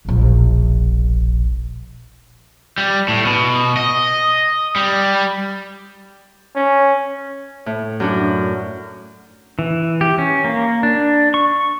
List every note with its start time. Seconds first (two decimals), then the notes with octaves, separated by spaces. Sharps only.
0.05 E1 A#1
2.78 G3
3.08 A2
3.25 B2
3.77 D#5
4.76 G3
6.55 C#4
7.66 A2
8.00 F#2 D4 F#4
9.59 E3
10.01 G4
10.18 C#4
10.44 A#3
10.83 D4
11.34 C#6